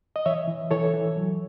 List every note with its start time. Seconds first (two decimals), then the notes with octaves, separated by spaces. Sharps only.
0.16 D#5
0.26 E3 C#5 E5
0.48 E3
0.71 E3 A4 C#5
0.94 E3
1.17 F#3